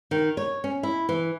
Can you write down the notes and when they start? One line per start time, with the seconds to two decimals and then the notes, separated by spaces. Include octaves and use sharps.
0.11 D#3
0.37 C#5
0.64 C#4
0.83 E4
1.09 E3